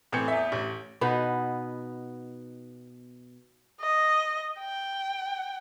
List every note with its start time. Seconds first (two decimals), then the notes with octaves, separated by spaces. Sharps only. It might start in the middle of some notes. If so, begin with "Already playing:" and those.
0.12 A2 E3 C4 G6 C#7
0.28 E2 E5
0.52 A1
1.01 B2 B3 D#4
3.81 D#5
4.60 G5